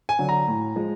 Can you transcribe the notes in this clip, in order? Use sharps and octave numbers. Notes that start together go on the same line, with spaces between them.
G#5
D3 F#3
A#5
A2
F3 G#3